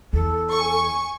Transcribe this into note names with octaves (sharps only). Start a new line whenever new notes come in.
E2 A4
G#5 C#6